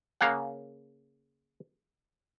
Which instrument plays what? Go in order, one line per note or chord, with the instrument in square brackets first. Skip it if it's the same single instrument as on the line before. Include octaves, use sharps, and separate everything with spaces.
[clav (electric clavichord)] C#3 A#3 F5 F#5